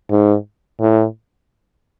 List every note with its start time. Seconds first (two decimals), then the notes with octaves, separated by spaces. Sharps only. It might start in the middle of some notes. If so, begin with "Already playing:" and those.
0.11 G#2
0.80 A2